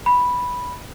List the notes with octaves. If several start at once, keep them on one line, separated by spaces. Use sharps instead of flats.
B5